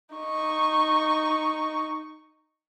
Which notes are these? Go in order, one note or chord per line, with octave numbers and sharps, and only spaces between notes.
D#4 C#6